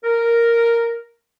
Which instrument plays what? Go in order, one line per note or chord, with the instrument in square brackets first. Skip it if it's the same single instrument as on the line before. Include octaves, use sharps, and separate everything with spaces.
[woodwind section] A#4